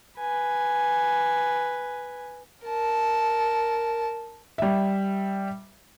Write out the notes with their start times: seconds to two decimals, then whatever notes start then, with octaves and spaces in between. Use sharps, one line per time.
0.20 B4 G#5
2.65 A#4 A5
4.58 G3 E5